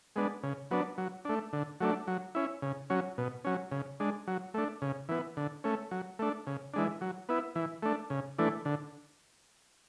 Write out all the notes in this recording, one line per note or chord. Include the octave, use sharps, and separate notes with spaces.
G#3 B3 D4
C#3
F#3 B3 D4
F#3
A3 D4
D3
F#3 A3 D4
F#3
C#4 E4
C#3
F#3 C#4
B2
F#3 C#4
C#3
G#3 D4
F#3
A3 D4
C#3
E3 B3
D3
A3 C#4
F#3
A3 D4
C#3
E3 G#3 D4
F#3
B3 E4
E3
A3 D4
C#3
E3 A3 D4
D3